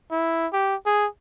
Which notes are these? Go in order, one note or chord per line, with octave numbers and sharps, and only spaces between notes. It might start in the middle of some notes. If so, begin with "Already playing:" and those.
E4
G4
G#4